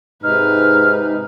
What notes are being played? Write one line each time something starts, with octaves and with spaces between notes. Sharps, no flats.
G#2 C3 D#4 B4 F6